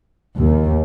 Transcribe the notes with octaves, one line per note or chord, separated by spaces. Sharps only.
D#2